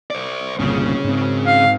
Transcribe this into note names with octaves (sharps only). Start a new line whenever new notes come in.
C5 D5
G1 C2 A#2 C#3 C#4
G#2 C4
F5